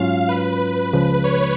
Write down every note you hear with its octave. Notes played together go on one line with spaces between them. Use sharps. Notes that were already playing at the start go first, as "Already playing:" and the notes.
Already playing: G#2 F#3 C#4 F4 F5
B4
C#2 C#3 F3 G#3
C#5